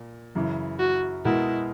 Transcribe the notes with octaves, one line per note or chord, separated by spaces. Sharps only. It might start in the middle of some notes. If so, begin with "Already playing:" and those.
Already playing: A#2
F#2 C#3 E3
F#4
B2 G#3 B3 E4 F#4 A#4